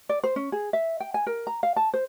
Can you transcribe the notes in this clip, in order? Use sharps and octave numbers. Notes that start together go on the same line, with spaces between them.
D5
C5
C#4
G#4
E5
G5
G#5
A#4
A#5
F5
A5
C5